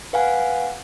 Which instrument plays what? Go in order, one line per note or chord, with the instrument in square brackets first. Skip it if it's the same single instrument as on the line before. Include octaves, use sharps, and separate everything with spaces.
[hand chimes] B4 F5 F#5 G#5